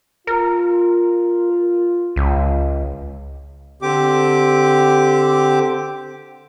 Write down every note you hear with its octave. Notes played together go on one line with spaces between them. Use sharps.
F4 A#4
C#2
D3 C4 G4 D6